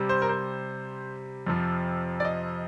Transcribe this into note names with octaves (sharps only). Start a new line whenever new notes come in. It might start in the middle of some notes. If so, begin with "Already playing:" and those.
Already playing: C3 G3
C5
A#4
C5
F2 C3 F3
D5
D#5